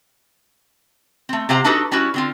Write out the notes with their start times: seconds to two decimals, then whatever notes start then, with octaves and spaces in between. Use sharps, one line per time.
1.29 A3 C4
1.49 C3 F4 G4 C5 F#5 A#5
1.64 D4 D#4 F#4 G4 A4 B4
1.91 G3 C#4 E4 F#4 B4
2.14 D3 C4 F4